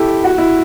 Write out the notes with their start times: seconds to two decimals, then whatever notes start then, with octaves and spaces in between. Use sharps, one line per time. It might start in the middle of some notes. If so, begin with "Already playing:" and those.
Already playing: E4 G4 A4
0.24 F#4
0.38 E4